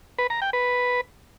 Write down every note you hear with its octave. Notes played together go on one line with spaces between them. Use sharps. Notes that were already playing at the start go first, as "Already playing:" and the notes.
B4
A#5
G5
B4